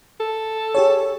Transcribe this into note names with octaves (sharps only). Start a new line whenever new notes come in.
A4
G4 G#4 C#5